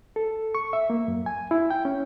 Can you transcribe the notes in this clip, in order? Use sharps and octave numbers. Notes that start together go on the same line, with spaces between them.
A4
C#6
E5
A#3
F#2
G#5
E4
G5
C#4